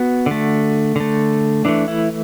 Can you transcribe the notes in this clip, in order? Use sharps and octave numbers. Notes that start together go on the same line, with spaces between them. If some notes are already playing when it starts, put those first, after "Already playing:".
Already playing: B3 F#4
D3 A3
D3 A3
E3 A3 D4
E4